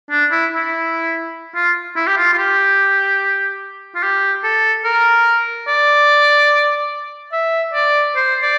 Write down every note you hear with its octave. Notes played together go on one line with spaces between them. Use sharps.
D4
E4
E4
F4
E4
G4
F4
F4
G4
F4
G4
A4
A#4
D5
E5
D5
C5
D5